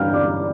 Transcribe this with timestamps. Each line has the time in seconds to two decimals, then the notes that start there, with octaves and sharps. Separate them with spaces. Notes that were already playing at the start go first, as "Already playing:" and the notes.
Already playing: G2 F5 G5 F6 G6
0.13 D5 D6